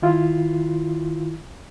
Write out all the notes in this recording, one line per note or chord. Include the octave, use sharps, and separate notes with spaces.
D#3 E4 F4